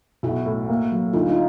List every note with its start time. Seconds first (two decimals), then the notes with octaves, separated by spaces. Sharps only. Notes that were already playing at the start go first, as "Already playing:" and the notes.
0.23 B1 E4 F#4
0.46 A2
0.69 A#3
0.92 F#3
1.13 D2 D#4 F4
1.28 D#4 F4